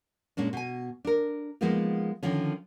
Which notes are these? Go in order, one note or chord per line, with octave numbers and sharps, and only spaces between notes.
A#2 G#3 C#4 D4
B2 G#5
D4 A#4
F3 G#3 A#3 B3 D#4 F4
D3 D#3 F3 C#4